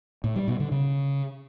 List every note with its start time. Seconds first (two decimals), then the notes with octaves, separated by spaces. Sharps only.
0.24 A2
0.36 G3
0.48 B2
0.60 D3
0.72 C#3